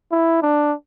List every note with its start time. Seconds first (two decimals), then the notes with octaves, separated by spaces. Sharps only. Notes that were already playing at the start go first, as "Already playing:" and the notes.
0.12 E4
0.42 D4